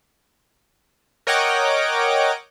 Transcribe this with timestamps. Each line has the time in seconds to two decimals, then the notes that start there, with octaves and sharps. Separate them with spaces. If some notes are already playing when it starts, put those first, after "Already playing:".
1.27 A#4 C#5 D#5 F#5 G5 D6